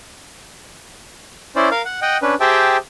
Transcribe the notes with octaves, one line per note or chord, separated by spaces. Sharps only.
C#4 E4 C5 D5
A#4 F5
F#5
D#5 F#5 G5
C#4 D4 B4
G4 G#4 C5 E5 G5 A5